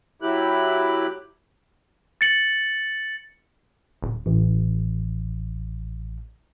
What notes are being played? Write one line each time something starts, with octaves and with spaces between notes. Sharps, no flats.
F#3 E4 G4 F#6
A6 C#7 F#7
D#1
A1